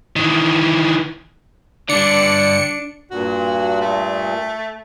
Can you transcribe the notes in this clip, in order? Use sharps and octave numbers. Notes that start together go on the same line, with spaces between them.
D#3 E3
G2 D3 D4 D5 C#7
G2 A#2 F#4
A3